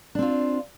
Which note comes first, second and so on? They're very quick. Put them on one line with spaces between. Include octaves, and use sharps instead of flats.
D4 C4 F4